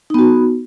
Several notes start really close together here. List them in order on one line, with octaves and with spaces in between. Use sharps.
D#4 B3 F#4